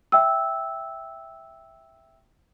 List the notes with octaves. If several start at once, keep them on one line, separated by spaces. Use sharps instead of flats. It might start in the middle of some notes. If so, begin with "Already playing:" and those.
E5 G5 E6